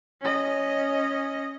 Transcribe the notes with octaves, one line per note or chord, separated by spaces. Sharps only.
C#4 D#5